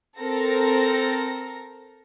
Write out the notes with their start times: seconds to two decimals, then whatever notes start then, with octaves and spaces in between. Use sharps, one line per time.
0.18 C4 A4 A#4 A#6